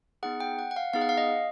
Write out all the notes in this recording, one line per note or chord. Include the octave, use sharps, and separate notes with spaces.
B3 D#4 G#4 F#5
G5
F#5
F#5
F5
B3 D#4 G#4 F5
F#5
F5
D#5